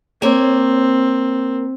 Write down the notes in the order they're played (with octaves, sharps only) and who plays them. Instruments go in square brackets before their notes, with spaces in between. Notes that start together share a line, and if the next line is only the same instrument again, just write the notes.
[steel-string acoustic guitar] A#3 C#5 [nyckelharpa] C4